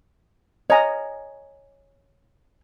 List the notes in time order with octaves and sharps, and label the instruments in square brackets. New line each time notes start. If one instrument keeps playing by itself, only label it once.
[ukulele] C#5 G#5 [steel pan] D#5 A#5